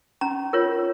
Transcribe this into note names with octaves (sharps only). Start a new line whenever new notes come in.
C#4 A#5
F4 A#4 C#5